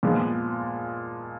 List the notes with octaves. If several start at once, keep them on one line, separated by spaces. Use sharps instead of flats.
A#2 F3 G#3 B3